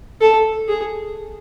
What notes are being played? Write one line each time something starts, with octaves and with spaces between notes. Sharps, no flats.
A4
G#4